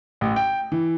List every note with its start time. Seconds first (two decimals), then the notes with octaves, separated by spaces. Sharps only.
0.21 A1
0.36 G5
0.72 E3